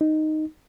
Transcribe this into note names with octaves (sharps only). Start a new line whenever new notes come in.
D#4